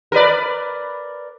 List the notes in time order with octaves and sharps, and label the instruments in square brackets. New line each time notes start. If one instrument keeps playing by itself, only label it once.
[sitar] A#4 B4 D5